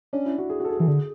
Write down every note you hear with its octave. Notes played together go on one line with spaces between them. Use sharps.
C#4 D4
E4
F#4
G#4
F#4
A4
G#4
E3 A4
D3 G#4